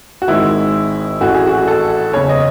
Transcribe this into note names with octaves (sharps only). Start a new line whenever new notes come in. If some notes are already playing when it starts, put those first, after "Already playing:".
F#4
G#1 G#2 D#3 G#3 E4
A1 A2 E3 F#4
G#4
F#4
A4
F#1 E2 C#3 C#5
D#5